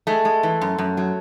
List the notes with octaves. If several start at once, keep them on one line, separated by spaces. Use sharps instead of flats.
G#3 A3
G#3
E3
F#2
F#2
F#3